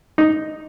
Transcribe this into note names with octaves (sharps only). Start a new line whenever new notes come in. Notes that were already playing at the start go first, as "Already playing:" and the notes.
D#4